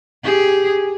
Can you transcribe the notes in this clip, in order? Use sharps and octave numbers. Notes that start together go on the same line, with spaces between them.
G4 G#4